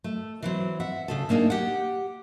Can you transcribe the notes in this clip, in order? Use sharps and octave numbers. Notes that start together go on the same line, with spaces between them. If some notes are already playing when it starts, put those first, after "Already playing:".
A3
E3 F#3 C4
E5 F#5
C#3 G#4 A4
A3 A#3 D4 D#4 G#4
G4 F#5